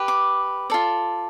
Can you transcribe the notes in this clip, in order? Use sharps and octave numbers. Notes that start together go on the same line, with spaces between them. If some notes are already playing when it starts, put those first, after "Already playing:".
Already playing: G4 B4
D6
F4 A4 D5